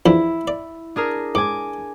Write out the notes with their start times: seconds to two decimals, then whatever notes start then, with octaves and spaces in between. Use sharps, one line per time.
0.06 E2 F3 D4 E4
0.48 D5
0.96 D4 G#4 A#4
1.35 G#2 G#5 D6